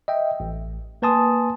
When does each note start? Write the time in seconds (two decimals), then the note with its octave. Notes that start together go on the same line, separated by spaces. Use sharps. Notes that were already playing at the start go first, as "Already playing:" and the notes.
0.08 D#5 E5 G5
0.40 A1
1.02 A#3 B4 G#5 A5 C6 D#6